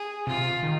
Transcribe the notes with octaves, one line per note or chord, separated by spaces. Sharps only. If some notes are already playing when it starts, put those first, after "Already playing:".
Already playing: G#4
C3 F4
D#3